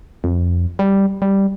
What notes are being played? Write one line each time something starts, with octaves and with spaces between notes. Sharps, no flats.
F2
G3
G3